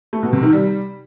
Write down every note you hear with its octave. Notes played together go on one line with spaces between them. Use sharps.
A3
B2
C3
D#3
G3